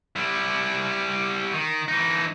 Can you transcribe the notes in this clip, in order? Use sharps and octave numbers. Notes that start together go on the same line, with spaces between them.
G3 E4
D#3
E3 D#4